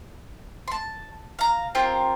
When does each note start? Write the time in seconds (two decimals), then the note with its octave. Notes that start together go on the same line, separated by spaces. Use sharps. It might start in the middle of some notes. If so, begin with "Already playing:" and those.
0.68 A5 C6
1.39 F5 A#5
1.75 C4 F4 G4 A#4